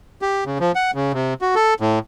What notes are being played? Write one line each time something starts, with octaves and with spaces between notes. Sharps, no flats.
G4
C#3
F3
F#5
C#3
C3
F#4
A4
A2